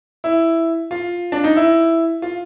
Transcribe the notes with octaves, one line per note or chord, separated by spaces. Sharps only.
E4
F4
D4
D#4
E4
F4